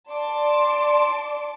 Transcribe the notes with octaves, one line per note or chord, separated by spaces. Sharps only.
D5 A5 C6 D6